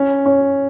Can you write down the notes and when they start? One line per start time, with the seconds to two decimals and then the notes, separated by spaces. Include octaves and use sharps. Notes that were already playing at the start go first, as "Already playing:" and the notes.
Already playing: C#4
0.26 C#4